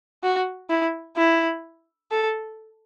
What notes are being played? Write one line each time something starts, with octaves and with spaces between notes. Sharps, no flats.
F#4
E4
E4
A4